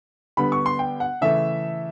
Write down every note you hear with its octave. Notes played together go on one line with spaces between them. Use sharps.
D3 G3 B3 B5
C#6
C6
G5
F#5
C#3 E3 A3 E5